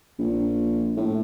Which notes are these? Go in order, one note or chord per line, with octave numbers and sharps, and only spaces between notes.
A#1
A2